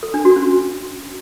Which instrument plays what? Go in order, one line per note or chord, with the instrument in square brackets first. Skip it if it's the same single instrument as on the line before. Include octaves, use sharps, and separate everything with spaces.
[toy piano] A4
D4
F#4
C#4